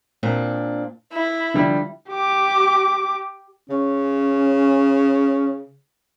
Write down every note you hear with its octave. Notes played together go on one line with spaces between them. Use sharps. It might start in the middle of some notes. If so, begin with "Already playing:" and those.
A#2 C4 D4
E4
D3 F3 G3
G4 D6
C#3 C#4